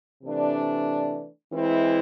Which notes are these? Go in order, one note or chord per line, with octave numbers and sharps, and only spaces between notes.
C3 E3 A3 D4
E3 G#3 C4 E4